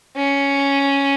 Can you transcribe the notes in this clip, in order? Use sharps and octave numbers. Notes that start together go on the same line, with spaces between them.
C#4